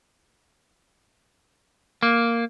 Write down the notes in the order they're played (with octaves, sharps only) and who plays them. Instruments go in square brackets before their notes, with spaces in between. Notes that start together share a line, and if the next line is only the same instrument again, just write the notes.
[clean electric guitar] A#3